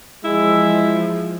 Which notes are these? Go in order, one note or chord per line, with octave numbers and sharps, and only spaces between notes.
F3 G#3 E4